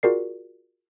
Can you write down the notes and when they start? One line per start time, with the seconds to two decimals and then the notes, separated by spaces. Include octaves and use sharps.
0.03 F4 F#4 G#4 A#4 D5 C7